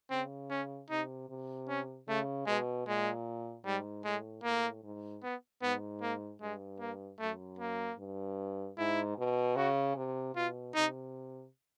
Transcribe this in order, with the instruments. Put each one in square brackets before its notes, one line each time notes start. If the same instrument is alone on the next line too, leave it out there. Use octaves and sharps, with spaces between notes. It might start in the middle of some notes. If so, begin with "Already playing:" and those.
[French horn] C#3 [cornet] C4
[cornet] C#4
[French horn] C3 [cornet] D#4
[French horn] C3
[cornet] C#4
[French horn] C#3 [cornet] A3
[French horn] B2 [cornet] G#3
[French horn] A#2 [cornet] G#3
[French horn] G#2 [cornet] G3
[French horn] A2 [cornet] G#3
[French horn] A2 [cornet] A#3
[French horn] G#2
[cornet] B3
[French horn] G#2 [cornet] B3
[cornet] A#3
[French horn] G2 [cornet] G#3
[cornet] A#3
[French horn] F#2 [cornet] A3
[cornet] A#3
[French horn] G2
[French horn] G#2 [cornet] E4
[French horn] B2
[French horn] C#3 [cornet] F#4
[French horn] C3
[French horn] B2 [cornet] F4
[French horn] C3 [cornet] D#4